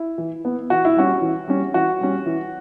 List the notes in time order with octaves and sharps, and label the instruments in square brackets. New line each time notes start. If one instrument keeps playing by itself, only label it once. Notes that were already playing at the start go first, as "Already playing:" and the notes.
Already playing: [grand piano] E4
E3
B3
E3 F#4
E4
G3 C#4 F#4
E3
G3 C#4
E3 F#4
G3 C#4
E3